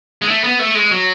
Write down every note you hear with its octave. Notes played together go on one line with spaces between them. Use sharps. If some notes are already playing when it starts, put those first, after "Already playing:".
G#3
A3
B3
A3
G#3
F#3